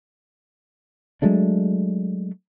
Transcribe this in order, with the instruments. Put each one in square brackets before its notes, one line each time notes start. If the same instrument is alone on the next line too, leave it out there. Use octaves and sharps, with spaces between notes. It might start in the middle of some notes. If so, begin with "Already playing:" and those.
[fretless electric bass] F#3 G#3 A3 D4